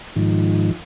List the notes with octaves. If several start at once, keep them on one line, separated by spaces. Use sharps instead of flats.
G#2 D#3 F3